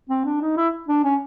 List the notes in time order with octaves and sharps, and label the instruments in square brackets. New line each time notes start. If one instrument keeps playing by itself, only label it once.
[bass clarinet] C4
D4
D#4
E4
D4
C#4